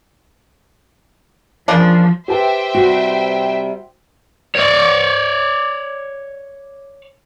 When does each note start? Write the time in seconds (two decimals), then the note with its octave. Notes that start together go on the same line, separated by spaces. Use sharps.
1.68 C#3 F3 A#3 D4
2.28 G4 B4 C5 E5 G5 A5
2.75 C3 G3 F#4
4.55 C#5 D5